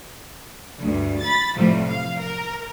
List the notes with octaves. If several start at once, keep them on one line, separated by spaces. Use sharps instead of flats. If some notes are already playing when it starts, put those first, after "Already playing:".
D2 G2
B5 A6
A2 C3 E3 F3 G3 A3
F5
A#4